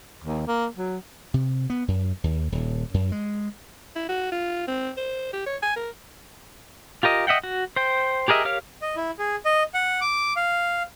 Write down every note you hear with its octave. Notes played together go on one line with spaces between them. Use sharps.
D#2
A#3
F#3
C3
B3
F#2
D#2
D#1
F#2
G#3
E4
F#4
F4
C4
C5
G4
C#5
G#5
A#4
F4 G4 A#4 D#5
D#5 E5 F#5 G5
F#4
C5 G5
G4 G#4 A#4 D#5 E5
G4 A#4 C#5 F5 F6
D#5
E4
G#4
D#5
F#5
D6
F5